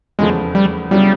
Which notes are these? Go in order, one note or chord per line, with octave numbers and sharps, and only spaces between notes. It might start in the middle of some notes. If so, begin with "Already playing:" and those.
F1 E2 C#3 F3 G#3 A3
G3
C#3 F#3 G3 B3 E4